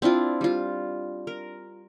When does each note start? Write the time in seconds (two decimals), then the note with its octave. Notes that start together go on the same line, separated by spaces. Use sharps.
0.02 C4 D4 E4 F4
0.41 G3 F4
1.27 A#4